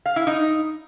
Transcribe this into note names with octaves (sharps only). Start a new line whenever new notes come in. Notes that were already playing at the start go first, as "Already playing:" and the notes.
F5
E4
D#4